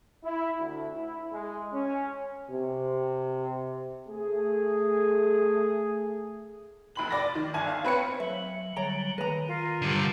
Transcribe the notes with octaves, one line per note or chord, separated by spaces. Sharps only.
E4
D2
E4
G#3
C#4
C3
A3 G#4
F1 B5 F#7
D5 A#6
D#3
G1 E5 G#5 A5
F5
C4 B4 C#5 C#7
F#3 E5
D3 F#3 G3 C#5 A#5
D#3 B4 A#5
F4 A#4
D3 G3